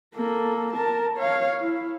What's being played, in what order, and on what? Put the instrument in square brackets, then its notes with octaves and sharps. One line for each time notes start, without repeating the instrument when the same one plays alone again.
[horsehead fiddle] A#3 A4
A#4 A5
C#5 F5
E4